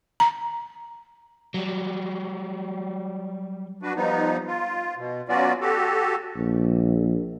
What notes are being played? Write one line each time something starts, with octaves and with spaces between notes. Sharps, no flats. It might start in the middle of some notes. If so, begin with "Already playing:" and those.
A#5
F#3 G3
D4 F#4 B4
F3 G3 B3 D#4
F4
B2
F#3 B3 C#4 F4 F#4 D5
F#4 G4 A4
A#1